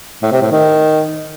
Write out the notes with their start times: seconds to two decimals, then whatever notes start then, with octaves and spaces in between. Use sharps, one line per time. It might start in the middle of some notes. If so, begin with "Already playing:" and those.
0.22 A2
0.32 C3
0.41 A2
0.51 D#3